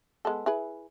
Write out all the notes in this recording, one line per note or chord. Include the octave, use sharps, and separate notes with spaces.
G#3 B3 A4
E4 G#4 B4